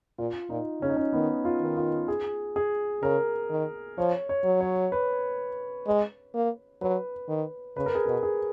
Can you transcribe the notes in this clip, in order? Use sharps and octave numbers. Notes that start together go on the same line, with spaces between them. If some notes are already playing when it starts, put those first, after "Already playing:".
A#2 F4
A#2 D#4
C#3 C#4
D#4
C#4
D#3 B3
F4
D#3
F4
G#4
G#4
C#3 A#4
D#3
F3 C#5
C#5
F#3
C#5
B4
G#3
A#3
F#3 B4
D#3
C#3 B4
A#4
G#4
B2 A#4
G#4